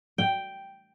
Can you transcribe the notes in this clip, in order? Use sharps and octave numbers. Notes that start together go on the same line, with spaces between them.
G5